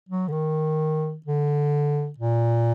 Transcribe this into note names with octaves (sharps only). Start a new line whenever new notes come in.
F#3
D3
D#3
D3
A#2